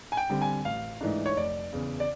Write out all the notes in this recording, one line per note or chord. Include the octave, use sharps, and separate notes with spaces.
G#5
G5
D3 G3 C4
G#5
A1 F5
G#2 E3 A3 D4
C#5
F1 D5
E2 C#3
D5